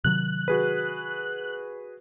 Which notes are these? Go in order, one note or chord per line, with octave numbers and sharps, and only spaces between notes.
C3 D#3 F#3 F#6
F#4 G#4 B4